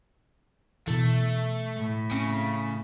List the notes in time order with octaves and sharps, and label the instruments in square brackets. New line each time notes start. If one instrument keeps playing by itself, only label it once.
[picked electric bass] B2 E3 [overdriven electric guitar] A3
[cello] A2
[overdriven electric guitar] C#3 [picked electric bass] C4